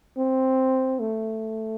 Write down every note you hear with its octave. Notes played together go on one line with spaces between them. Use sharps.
C4
A3